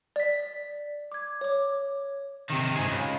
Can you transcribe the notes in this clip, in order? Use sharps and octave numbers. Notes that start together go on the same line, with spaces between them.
D5 B6
D6 G#6
C#5 D6
C3 D#3
G#2 G#4
C#2